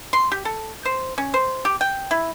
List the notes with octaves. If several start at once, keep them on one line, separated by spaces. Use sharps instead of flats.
C6
G4
A4
C5
C#4
C5
G4
G5
E4